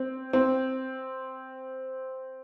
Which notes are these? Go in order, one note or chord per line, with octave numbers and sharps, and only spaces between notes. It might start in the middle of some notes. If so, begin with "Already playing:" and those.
Already playing: C4
C4